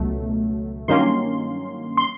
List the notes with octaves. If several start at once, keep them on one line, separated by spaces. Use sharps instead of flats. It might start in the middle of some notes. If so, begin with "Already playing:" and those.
Already playing: C#2 B2 F#3 A3
G2 D#3 F#3 A#3 C#4 C6
C6